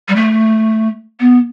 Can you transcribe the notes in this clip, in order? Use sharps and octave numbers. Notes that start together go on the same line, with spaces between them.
G3
A3
B3